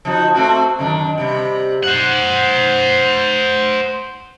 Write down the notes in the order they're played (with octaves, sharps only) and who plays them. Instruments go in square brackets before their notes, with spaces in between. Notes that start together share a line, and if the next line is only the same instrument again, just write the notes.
[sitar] F3 D#4 F#4
A3 C4 F#4
F#2 D#3 D4
C3 G3
[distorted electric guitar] C5 F#5